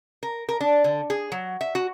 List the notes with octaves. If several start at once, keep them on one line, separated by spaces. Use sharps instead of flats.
A#4
A#4
D4
D3
G#4
F#3
E5
F#4